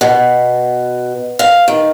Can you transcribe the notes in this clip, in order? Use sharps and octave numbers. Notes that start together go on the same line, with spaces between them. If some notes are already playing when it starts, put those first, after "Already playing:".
B2
F5
D#3